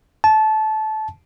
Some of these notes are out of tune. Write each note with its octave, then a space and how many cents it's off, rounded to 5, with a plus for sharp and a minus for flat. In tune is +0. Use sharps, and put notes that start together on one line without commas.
A5 -20